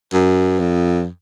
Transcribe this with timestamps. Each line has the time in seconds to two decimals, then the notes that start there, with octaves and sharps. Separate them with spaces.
0.13 F#2
0.59 F2